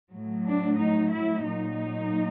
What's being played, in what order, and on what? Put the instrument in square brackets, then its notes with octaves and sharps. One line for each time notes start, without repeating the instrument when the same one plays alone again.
[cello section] A2 F#3
D4
D#4
E4
A#2 F#3 D#4